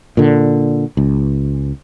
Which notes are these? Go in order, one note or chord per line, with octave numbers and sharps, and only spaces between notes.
A#2 D3
C#2